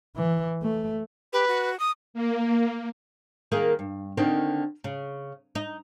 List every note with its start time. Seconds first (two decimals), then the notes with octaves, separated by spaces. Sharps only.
0.16 E3
0.62 A3
1.33 G4 B4
1.48 F#4
1.80 D#6
2.14 A#3
3.52 D#3 A#3 G#4
3.79 G2
4.17 D3 D#3 C4
4.84 C#3
5.55 D#4